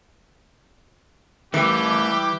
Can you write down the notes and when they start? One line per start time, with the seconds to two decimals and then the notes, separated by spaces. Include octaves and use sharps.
1.54 E3 G3 A3 E4 G4 G#4 A#4